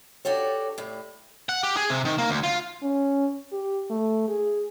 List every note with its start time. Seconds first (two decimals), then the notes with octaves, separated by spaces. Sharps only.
0.25 D4 F#4 G4 A4 C#5
0.78 A2 G3
1.49 F#5
1.63 G4
1.77 G#4
1.90 C3
2.05 D#3
2.18 A#3
2.30 D2
2.43 F4
2.82 C#4
3.52 G4
3.90 A3
4.28 G#4